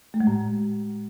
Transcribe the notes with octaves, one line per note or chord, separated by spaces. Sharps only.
A3
G#3
A2